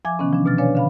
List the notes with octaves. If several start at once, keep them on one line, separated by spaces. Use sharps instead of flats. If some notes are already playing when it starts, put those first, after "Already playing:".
F3 E5 G#5 D6 G#6
C3 D#3 E3 B3 C#4
F3 D4
B2 F6 A6
D4 B4 C#5 D5 F5 G#5
D3 F5 B5